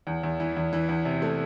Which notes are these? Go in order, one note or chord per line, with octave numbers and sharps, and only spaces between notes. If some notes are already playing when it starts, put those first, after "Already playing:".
E2
E2
E3
E2
E3
E2
C3
A3